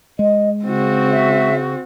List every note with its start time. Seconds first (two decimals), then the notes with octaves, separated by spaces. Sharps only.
0.19 G#3 D#5
0.65 C#3 C4 F#4
1.11 E5